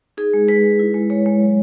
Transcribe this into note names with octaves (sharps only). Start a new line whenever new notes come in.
D#4 G#4
G#3
G#3 B4
G#3
E4
G#3
G#3 C#5
G#3
F#3